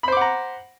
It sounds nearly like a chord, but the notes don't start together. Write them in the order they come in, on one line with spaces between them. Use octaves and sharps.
B5 C5 D6 F#5 A#5